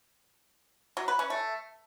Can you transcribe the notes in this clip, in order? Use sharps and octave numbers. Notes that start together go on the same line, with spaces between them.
F#3
B4
C#4
A3